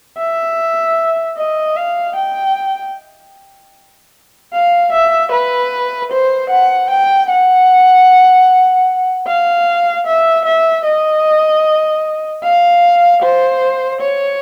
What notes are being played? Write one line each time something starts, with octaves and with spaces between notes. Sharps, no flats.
E5
D#5
F5
G5
F5
E5
B4
C5
F#5
G5
F#5
F5
E5
E5
D#5
F5
C5
C#5